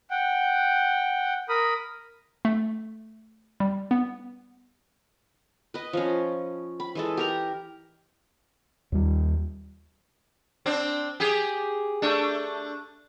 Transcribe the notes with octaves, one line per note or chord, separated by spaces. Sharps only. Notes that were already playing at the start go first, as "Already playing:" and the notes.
F#5 G5
A#4 B5 D#6
A3
G3
B3
B4 D#5
F3 C#4
B5
E3 G#3 A4
G4 A#4 A#5
D#2 G3
C4 D4
G4 G#4
A3 D4